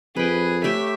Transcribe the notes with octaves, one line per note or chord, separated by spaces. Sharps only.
F2 G#4 B4 G5
A3 G4 C#5 E5